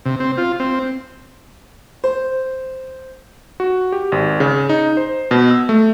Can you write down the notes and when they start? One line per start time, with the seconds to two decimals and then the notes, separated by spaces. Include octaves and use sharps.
0.05 C3
0.20 C4
0.38 F4
0.60 C4
2.04 C5
3.60 F#4
3.92 G4
4.12 G#1
4.40 C#3
4.69 D#4
4.97 C5
5.31 B2
5.50 E6
5.69 A3